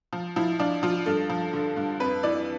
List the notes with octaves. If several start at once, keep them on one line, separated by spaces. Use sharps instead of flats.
F3
F3 E4
F3 D4
F3 F4
G2 A4
F3
D3
G2
F2 B4
E3 D5